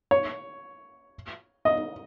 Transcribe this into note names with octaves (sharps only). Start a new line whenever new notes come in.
C#5
D#5